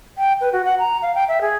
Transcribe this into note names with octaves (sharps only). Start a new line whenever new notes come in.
G5
B4
F#4
F#5
A#5
F5
G5
E5
G#4